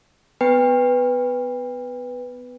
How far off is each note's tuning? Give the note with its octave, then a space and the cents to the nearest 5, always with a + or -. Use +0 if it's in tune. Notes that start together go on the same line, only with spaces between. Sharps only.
B3 +25 B4 +0 G5 +35